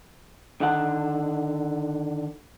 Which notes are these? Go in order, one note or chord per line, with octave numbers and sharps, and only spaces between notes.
D3 D#3 F#5